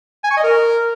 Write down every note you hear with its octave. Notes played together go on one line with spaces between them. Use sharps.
G#5
C#6
D#5
A#4